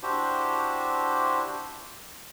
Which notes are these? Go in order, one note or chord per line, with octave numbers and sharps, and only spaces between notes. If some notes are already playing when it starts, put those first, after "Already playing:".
D4 E4 F#4 G4 C5